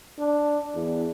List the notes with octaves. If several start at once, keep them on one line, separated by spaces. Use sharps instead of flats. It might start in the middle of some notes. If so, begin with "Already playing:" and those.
D4
E2